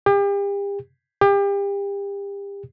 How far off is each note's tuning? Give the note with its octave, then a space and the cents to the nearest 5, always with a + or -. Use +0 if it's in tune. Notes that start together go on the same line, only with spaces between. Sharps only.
G4 +40
G4 +35